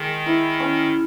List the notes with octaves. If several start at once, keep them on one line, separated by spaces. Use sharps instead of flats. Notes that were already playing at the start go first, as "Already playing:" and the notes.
Already playing: D#3 G#3 G#4
E4
C#4